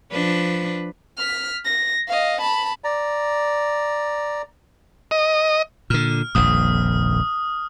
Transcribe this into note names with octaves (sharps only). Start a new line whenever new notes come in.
F3 D4 B4
F6 B6
A#6
D#5 F5
A5 B5
D5 A#5
D#5
A#2 D3 F6
D#1 A#1 F2 D#6